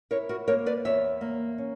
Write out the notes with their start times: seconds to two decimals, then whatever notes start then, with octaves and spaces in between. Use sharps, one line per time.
0.11 E4 A#4 C#5
0.29 F#4 A#4
0.48 A#3 A#4 C#5
0.66 B4 D5
0.85 E2 C#5 E5
1.21 A#3
1.58 C#4